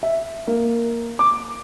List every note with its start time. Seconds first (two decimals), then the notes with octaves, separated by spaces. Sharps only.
0.03 E5
0.47 A#3
1.19 D6